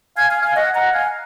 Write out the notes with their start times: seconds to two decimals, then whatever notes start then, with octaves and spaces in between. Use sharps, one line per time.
0.17 F5 G#5
0.30 F5 G#5
0.43 F5 G#5
0.55 D#5 F#5
0.75 F#5 A#5
0.93 F5 G#5